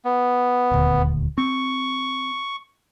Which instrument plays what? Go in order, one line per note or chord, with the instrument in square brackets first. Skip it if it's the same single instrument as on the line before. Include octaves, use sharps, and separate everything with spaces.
[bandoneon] B3
[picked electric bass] D#1 D2
[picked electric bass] C4 [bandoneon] C#6